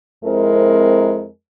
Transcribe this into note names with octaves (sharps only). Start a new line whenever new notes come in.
F2 G#3 C4 E4 A#4